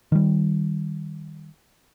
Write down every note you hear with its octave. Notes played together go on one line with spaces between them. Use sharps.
D#3 G3